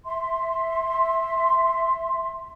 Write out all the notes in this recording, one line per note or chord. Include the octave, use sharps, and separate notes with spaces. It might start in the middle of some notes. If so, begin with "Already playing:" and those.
E5 C6